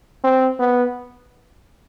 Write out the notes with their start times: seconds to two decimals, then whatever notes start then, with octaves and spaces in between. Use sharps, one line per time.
0.24 C4
0.59 B3